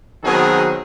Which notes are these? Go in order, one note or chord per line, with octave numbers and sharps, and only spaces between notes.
B2 D#3 F#3 C4 G#4 D#5